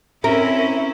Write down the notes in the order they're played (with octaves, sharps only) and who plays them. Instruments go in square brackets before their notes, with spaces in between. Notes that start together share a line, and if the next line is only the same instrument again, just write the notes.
[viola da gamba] C4 C#4 E4 [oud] A#4 [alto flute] E5